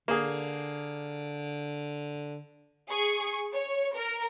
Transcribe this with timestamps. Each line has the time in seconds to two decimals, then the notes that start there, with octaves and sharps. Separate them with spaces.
0.08 D3 A#3 G#4
2.89 G#4 C#6
3.53 C#5
3.94 A#4